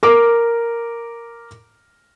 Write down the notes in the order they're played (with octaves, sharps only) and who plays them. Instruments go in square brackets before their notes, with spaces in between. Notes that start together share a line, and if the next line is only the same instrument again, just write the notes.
[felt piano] A#4 D6